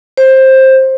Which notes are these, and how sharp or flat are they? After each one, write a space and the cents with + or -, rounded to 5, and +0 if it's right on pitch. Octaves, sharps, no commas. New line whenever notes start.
C5 +15